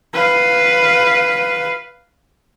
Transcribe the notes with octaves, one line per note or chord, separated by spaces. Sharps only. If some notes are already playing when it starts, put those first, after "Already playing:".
B4 F5